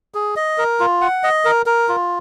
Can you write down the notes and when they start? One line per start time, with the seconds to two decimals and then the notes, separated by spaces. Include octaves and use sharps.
0.14 G#4
0.36 D#5
0.58 A#4
0.80 F4
1.01 F#5
1.23 D#5
1.45 A#4
1.66 A#4
1.89 F4